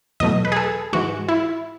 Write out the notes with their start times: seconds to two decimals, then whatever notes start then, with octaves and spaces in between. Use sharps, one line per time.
0.20 E2 B2 F#3 A3 D#5
0.45 B4
0.52 G#4
0.57 A4
0.93 G#2 E3 G#3 F#4
1.28 E4